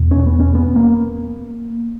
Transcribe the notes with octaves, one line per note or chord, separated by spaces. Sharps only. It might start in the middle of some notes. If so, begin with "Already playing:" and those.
Already playing: E2 B2
C#4
B3
C#4
B3
A#3